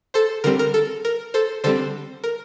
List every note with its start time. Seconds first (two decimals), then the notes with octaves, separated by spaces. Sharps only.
0.14 A4 C5
0.44 D3 G3 C4 A#4
0.59 A#4
0.74 A4
1.05 A#4
1.34 A4 C5
1.64 D3 G3 C4 A4 C5
2.24 A#4